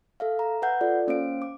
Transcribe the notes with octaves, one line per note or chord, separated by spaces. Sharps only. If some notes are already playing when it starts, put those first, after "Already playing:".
A4 E5 F5
A#5
B4 E5 F#5 G6
F4 A4 D5
A#3 C#4 C5 F5 D7
D6